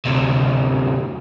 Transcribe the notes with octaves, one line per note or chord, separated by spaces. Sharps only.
D2 C3